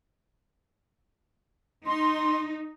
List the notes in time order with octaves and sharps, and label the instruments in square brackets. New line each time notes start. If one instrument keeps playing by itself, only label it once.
[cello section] D#4 [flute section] C6